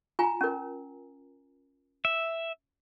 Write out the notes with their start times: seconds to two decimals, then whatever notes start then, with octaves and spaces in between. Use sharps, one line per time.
0.19 F4 G#5 A#5
0.41 C#4 A#4
2.05 E5